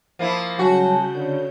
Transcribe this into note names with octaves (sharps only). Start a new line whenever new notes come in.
F3 A#3 E4
C#3 F#3 G3 F#4 G#5 A5 G6
D3 C#5